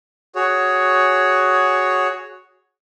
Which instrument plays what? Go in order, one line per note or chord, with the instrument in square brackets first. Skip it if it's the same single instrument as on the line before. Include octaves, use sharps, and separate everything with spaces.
[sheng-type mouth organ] F#4 G#4 C#5